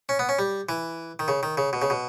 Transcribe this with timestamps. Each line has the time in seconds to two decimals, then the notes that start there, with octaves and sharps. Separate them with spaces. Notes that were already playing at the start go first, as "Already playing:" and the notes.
0.09 C#4
0.19 B3
0.29 C#4
0.39 G3
0.69 E3
1.19 D#3
1.28 C#3
1.43 D#3
1.57 C#3
1.73 B2
1.82 C#3
1.90 B2